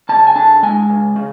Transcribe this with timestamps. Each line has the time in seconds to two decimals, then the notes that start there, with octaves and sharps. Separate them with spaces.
0.09 C#3 A5
0.27 G#5
0.35 D4 A5
0.63 G#3 G#5
0.90 C#3
1.16 C#3